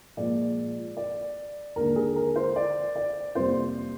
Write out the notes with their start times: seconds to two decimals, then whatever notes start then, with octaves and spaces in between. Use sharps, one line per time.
0.17 A#2 F3 G#3 D5
0.97 D5
1.76 D#2 D3 G#3 A#4
1.96 G#4
2.16 A#4
2.36 C5
2.56 D5
2.96 D5
3.35 F2 C3 G3 A#3 C5